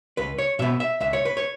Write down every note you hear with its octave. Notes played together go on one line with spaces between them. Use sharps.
C#2 B4
C#5
B2 B3 E5
E5
C#2 E5
C#5
B4
C#5